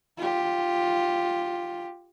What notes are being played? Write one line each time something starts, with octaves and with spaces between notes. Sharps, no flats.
F4 G4